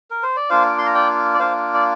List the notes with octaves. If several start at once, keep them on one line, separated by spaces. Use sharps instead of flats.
A#4
C5
D5
A#3 D4 F4 C5 F5
D6
C6
A#5
D5 G5
D5
A#3 D4 F4 C5 F5
D5